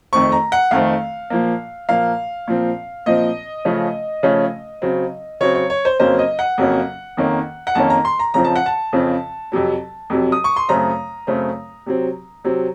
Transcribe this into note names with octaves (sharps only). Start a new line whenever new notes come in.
F2 D#3 A3 C4 C#6
A#5
F#5
F2 D#3 A3 C4 F5
A#2 F3 A#3
A#2 F3 A#3 F5
A#2 F3 C4
A#2 F3 C4 D#5
C#3 F3 A3 C#4
C#3 F3 A3 C#4
C#3 F#3 C4
C#3 F#3 C4 C#5
C#5
C#5
C5
F2 C#3 F#3 A#3 C#4 C5
D#5
F#5
F2 C#3 F#3 A#3 C#4
F2 D#3 A#3 C#4
F#5
F2 D#3 A#3 C#4 A5
A#5
C6
A#5
F2 C#3 F3 C4 A#5
A5
F#5
A5
F2 C#3 F3 C4
F2 C3 F#3
F2 C3 F#3
D#6
C#6
C6
F#2 C#3 A3 C4 A#5
F#2 C#3 A3 C4
C3 F#3 C4
C3 F#3 C4